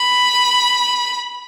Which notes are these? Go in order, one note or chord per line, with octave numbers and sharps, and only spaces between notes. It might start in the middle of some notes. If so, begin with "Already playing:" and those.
Already playing: B5